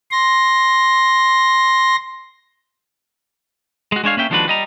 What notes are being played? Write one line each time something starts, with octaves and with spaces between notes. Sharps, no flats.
C6 A#6
G#3 F#4
G#3 D4 C#5 F5
A#3 C#4 E5 G5
D#2 F3 G#3 D4 F#4 B4
G3 D#5 A#5